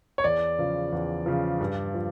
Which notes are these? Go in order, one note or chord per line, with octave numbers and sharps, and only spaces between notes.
C#5
E2 D5
C#3 F3
E2
C#3 F3
G2
F3